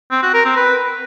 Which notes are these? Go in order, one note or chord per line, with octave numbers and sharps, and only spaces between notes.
C4
F#4
A#4
C4
B4